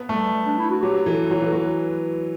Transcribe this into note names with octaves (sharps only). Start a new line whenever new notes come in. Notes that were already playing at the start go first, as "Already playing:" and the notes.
Already playing: B3
G3 A3
G3
D4
E4
F#4
F#3 G4
E3 A4
F#3 B4
E3 A4
F#3
B4